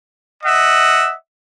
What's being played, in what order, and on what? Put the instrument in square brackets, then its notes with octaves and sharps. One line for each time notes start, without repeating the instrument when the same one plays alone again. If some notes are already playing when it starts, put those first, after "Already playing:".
[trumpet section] D#5 E5 F#5